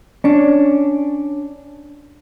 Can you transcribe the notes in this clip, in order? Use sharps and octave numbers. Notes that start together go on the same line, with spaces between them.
C#4 D4